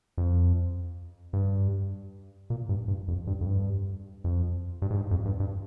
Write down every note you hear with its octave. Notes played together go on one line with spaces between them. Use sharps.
F2
G2
A#2
G2
G2
F2
G2
F2
G2
F2
G2
G#2
G2
F2
G2
G2